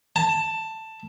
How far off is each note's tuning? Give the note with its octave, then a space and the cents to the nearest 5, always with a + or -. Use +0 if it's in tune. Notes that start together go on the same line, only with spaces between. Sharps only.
A5 +10